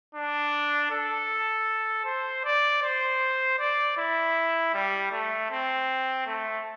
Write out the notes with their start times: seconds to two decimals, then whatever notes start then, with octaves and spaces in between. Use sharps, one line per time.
0.15 D4
0.91 A4
2.05 C5
2.44 D5
2.83 C5
3.59 D5
3.98 E4
4.74 G3
5.12 A3
5.51 C4
6.26 A3